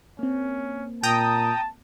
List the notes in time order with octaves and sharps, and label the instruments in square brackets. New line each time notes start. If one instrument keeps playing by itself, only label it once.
[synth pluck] A#3 C4 [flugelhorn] C#4
[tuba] A#2 [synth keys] G5 A#5 D#6 [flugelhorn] A5